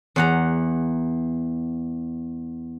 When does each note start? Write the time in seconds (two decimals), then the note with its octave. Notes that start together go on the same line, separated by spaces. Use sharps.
0.16 E2 F#5 A#5